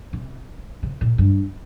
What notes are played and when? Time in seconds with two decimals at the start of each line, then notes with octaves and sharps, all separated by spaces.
0.13 C3
0.83 C3
1.01 A#2
1.18 G2